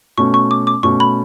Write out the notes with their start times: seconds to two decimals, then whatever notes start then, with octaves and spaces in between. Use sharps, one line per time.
0.18 B2 A3 C#4 C#6
0.34 C#6
0.51 D6
0.67 D6
0.83 B2 A3 C#4 C#6
1.00 B5